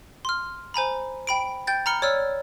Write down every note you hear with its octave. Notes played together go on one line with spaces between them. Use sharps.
C6 F6
C5 G#5 A#5 B5
G5 B5 D7
G5 G6 A6
A#5 B5 F6 C#7 G7
C#5 D5 E6 F6